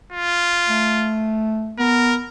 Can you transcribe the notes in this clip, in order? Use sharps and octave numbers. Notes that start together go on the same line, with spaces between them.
F4
A3
B3 A#4